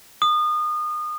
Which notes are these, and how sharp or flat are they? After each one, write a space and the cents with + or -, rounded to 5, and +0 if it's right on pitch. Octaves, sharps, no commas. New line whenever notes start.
D#6 -30